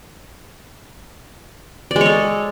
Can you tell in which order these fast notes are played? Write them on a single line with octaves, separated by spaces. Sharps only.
D5 G#3 C#5 A4